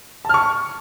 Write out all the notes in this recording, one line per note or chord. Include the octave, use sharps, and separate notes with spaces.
A5 C#6 F6